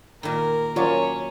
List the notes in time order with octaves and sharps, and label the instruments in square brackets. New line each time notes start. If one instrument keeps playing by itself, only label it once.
[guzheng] A#2 D#3 [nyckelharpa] A#4
[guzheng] F#3 [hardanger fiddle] C#4 [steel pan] F4 C#5 D5